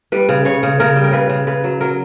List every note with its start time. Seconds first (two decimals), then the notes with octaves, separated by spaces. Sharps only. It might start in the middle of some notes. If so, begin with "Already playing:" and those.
0.12 G3 B4
0.29 C#3
0.45 C#3 C#5
0.63 C#3
0.80 C#3 A#4
0.96 G3
1.04 A#4
1.13 C#3 B4
1.30 C#3
1.47 C#3 B4
1.64 F#3
1.81 F#3 A#4